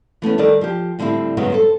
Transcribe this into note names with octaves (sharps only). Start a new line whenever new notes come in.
E3 A3 B3 C#4
D#3 G3 A4 A#4 D5
F3 G4
A2 D3 G3 C4 E4
G2 C#3 F#3 G#3 B3 F#4
A4 C5